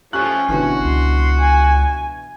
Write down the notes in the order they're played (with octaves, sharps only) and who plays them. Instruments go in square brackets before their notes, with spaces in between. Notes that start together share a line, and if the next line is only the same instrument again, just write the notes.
[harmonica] F3 A3 [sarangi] C#4 [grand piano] G4 C#6 F#6
[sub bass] G#1 [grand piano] B2 D3 E3 [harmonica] F#4
[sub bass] C#2 [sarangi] C6
[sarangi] G#5